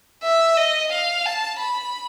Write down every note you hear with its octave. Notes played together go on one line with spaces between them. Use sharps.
E5
D#5
F5
A5
B5